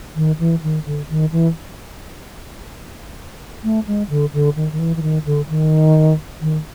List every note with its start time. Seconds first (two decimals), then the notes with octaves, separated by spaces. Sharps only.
0.16 D#3
0.39 E3
0.63 D#3
0.86 D3
1.09 D#3
1.32 E3
3.63 A3
3.87 G#3
4.09 D3
4.33 D3
4.56 D#3
4.72 D#3
4.79 E3
4.96 E3
5.02 D#3
5.25 D3
5.49 D#3
6.41 D#3